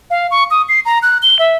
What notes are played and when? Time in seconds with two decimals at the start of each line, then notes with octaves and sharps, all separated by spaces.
0.10 F5
0.31 C#6
0.51 D#6
0.69 C7
0.85 A#5
1.02 F#6
1.23 G7
1.39 E5